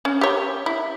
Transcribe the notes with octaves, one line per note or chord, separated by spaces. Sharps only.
C#4
G4 C#5
E4